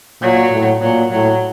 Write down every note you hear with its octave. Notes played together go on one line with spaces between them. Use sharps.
A#2 F#3
A2
A#2 F#3
A2 F#3